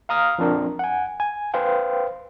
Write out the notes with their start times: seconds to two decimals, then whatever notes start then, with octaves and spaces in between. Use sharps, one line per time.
0.09 F5 A#5 D#6 F6
0.39 F3 C4 D4 A#4
0.79 F#5 G#5
1.20 G#5
1.54 B4 C5 F5 G5